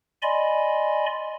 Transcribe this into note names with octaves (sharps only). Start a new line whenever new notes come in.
D5 D#5 G#5 B5 C6